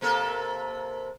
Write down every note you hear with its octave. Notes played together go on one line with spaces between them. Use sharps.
C3 A#3 A4